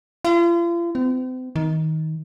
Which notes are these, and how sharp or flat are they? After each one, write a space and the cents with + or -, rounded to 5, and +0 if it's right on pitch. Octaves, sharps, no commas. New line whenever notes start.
F4 -40
C4 -40
D#3 +20